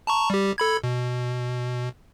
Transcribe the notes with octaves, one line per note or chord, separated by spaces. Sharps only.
A5 A#5 C#6
G3 G4
A4 B5 G#6
B2